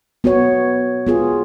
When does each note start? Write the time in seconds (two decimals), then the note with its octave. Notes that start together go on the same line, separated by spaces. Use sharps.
0.24 B3 F#4 C#5
1.07 B3 F4 G#4